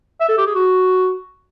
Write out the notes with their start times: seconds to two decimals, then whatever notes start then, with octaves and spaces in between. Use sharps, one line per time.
0.20 E5
0.29 A4
0.38 G4
0.46 G#4
0.55 F#4